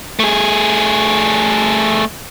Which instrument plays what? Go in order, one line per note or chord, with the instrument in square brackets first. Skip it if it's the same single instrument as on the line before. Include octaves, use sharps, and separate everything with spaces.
[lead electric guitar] A3 G#4